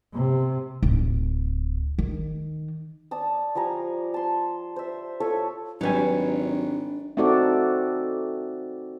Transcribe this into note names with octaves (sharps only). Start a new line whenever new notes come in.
C3
D1
D#3
D5 A5 D#6
F3 G3 G#5 A#5
A5 C6
C5 E5
F4 A4 C#5 E5
G#1 F#3 G3 D4 D#4 B4 G#5
A3 C4 D#4 F#4 A4 D5